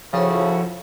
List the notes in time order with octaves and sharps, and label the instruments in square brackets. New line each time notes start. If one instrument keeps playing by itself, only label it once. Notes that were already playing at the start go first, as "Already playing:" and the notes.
[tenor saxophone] C#3 [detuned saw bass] F3 [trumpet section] E4 F#4 A4 [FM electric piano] C5 C#5 G5